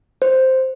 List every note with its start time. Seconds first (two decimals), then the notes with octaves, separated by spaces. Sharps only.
0.22 C5